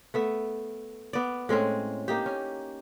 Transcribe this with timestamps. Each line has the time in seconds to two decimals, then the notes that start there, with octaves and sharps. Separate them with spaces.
0.14 A3 B3 E5
1.13 B3 D5
1.49 A2 G#3 C4 C#4
2.08 A#3 D#4 G4
2.26 C#4